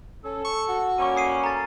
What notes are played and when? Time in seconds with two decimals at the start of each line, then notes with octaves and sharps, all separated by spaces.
0.24 C#4 A4
0.44 C#6
0.68 F#4
0.98 G3 A#3 C#4 C#6 D#7
1.16 D#6 C7 D#7
1.44 A4 A#5 A6